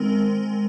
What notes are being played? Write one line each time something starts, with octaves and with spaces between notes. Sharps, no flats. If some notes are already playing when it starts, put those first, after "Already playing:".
Already playing: D#3 G#3 C4 A#4